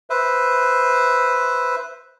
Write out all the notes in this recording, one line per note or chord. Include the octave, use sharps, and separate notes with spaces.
B4 C5 E5